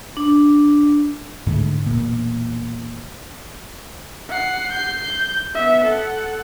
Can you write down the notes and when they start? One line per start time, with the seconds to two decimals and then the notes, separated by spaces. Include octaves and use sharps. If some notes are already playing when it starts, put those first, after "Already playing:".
0.17 D4
1.46 G#2 D3 G#3 A3
1.86 E1 A#2
4.28 F#5 C7
4.71 G6 C7
5.03 G6
5.54 B3 E5
5.84 A4 F#5